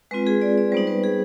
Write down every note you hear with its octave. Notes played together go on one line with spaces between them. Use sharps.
G#3 C4 F4 B4
G#4
D5
D5
G3 B3 D#4 C5
B4
G#4